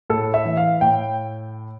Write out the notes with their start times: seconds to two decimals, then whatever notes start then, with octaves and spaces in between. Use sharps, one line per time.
0.10 A2 A4
0.34 E5
0.45 E3
0.57 F5
0.81 A2 G5